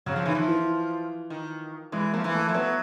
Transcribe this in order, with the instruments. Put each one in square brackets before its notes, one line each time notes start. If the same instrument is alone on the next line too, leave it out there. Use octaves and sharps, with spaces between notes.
[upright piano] C#3 [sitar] F#3
[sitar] F3
[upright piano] D#3 [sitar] E3
[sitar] F3
[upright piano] E3
[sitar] D#3
[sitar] E3 [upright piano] G#3
[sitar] F3 [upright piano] A#3
[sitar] E3
[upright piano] A3
[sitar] F3
[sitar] F#3 [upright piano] B3